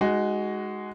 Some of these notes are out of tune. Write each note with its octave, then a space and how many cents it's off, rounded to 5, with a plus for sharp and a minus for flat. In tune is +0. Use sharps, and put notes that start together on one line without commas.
G#3 +0 D#4 +0 F#4 +15